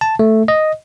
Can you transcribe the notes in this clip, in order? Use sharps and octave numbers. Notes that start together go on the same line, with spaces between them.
A5
A3
D#5